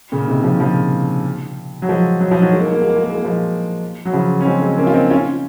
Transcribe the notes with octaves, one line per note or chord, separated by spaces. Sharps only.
A#2 C#3
C3 D#3
C#3 F3
C#3 F3
F#3
F3 G#3
F#3
F3
D#3 F#3
G#3
A#3
G#3
A#3
G#3
A#3
G#3
A#3
G#3
A#3
F3 G#3
F#3
C#3 F3
C#4
G#3 C4
G#3 C4
A#3 C#4
F4
C4 D#4
C#4 F4